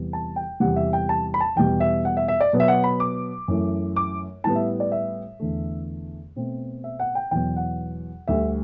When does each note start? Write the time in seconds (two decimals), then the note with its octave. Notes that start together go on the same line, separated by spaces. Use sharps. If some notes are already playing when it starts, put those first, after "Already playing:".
Already playing: E2 C3 G3 B3
0.13 A5
0.36 G5
0.60 E2 C3 G3 F#5
0.76 E5
0.93 G5
1.09 A5
1.34 B5
1.41 A5
1.56 E2 B2 G3 G5
1.80 E5
2.05 F#5
2.17 E5
2.28 E5
2.41 D5
2.53 B2 F#3 B3
2.60 E5
2.68 F#5
2.84 B5
3.00 D6
3.48 F#2 E3 A3
3.96 D6
4.44 A2 G3 B3 A5
4.56 E5
4.80 D5
4.92 E5
5.40 E2 D3 A3
6.36 B2 A3 C4
6.84 E5
7.00 F#5
7.15 G5
7.31 E2 B2 F#3 B3 G5
7.56 F#5
8.28 D2 D3 G3 E5